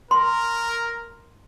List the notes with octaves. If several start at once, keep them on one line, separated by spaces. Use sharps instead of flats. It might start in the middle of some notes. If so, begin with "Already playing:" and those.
A#4 C6